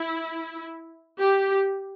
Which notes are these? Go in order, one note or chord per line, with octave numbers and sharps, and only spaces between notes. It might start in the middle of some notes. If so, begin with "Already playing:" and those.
Already playing: E4
G4